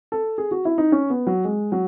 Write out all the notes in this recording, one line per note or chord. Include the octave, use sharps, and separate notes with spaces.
A4
G#4
F#4
E4
D#4
C#4
B3
F#3
G#3
F#3